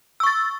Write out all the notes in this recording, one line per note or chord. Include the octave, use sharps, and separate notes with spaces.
C#6 E6 A6